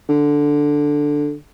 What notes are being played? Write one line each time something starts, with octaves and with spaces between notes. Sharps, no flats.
D3